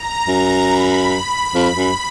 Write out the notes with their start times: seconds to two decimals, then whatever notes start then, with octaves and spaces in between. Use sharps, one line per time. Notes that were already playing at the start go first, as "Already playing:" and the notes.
Already playing: A#5
0.27 F#2
0.70 B5
1.55 F2
1.76 F#2